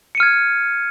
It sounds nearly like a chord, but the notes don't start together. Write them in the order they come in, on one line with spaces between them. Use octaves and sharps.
C#7 D#7 F6 G#6